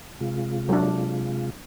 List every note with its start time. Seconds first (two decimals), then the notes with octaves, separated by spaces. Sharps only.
0.20 C3 G#3 F4
0.69 F#3 D4